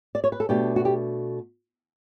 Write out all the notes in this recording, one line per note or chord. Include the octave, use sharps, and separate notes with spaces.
D5
C#5
B4
A4
B2 A3 D4 G4
F#4
G4